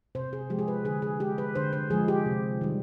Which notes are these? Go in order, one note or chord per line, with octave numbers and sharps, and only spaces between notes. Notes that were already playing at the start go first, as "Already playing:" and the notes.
C3 C5
G#4
F3 G#3 G4
G#4
B4
D3 G#4
G#4
G#3 G4
B4
D3 C5
C5
F3 G#3 G#4
G4
C3
D#3 G3